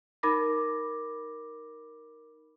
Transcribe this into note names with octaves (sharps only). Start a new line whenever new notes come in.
D#4 A#4 B5 D6 A#6